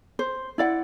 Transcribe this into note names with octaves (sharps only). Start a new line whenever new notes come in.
C5
E4 D5 F5 F#5